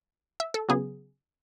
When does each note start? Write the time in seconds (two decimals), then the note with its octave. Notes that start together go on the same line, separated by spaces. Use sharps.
0.40 E5
0.54 A4
0.69 C#3 F#3 B3 G#4